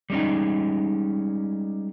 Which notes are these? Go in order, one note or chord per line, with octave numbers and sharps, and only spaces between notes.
G3 G#3 C#4 D#4